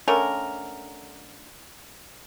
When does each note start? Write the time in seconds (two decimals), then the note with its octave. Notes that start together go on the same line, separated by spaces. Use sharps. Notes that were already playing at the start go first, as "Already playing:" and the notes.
0.08 D3 A3 C#4 A#4